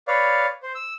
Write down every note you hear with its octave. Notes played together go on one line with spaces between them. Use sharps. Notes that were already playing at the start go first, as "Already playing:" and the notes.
B4 C#5 D5 F5
C5
E6